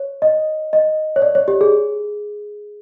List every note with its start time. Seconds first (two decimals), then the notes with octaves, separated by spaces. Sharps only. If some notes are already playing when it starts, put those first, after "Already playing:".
Already playing: C#5
0.22 D#5
0.73 D#5
1.16 C#5
1.22 D5
1.35 C#5
1.48 G4
1.61 G#4